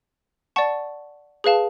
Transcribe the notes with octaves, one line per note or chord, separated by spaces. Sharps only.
D5 F#5 A5 C#6
G#4 B4 F5 A5